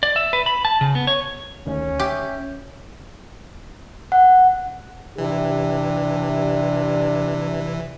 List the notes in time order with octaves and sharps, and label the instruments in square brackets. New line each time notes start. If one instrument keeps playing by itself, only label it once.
[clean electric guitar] D5
E5
B4
B5
A5
C#3
B3
C#5
[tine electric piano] D2 D#3 [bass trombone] C#4
[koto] G4 [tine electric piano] E5
[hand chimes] F#5
[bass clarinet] C3 [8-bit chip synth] E3 [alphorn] D4 [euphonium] G4